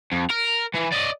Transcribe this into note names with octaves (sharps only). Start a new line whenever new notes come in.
F2
A#4
E3
D5 D#5